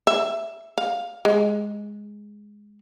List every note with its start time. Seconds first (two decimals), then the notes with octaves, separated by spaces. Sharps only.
0.07 E5
0.78 F5
1.25 G#3